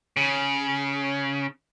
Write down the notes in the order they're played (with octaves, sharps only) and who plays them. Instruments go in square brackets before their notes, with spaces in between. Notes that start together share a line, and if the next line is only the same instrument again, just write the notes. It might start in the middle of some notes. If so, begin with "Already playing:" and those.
[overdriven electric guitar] C#3